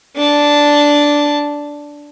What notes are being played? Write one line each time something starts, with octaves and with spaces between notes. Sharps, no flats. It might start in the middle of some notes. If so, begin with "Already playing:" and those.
D4 A5